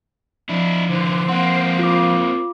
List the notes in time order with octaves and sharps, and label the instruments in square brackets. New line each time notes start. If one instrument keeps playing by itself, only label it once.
[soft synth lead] F3 [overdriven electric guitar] D4 E4
[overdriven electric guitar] D3 E3 [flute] C5
[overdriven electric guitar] A#3 C4 [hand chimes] F#5 C6
[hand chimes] F4 D6